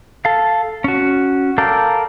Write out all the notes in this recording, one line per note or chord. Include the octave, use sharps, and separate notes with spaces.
A4 F5
C#4 F#4
A4 A#4 D5 F5 G5